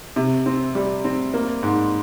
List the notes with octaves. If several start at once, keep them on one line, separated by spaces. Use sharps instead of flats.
C3
C4
G3
C4
A#3
G#2